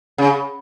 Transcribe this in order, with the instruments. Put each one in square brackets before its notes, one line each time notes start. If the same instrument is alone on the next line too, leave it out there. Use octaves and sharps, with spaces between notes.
[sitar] C#3